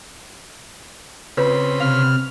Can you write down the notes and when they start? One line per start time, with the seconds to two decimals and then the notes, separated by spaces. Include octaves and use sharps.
1.37 C#3 C4 F4 B4 C#5 B5
1.80 C3 F5 F6